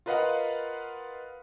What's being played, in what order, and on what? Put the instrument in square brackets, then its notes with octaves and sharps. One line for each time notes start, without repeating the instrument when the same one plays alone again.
[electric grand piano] F4 A#4 B4 D#5 F5 F#5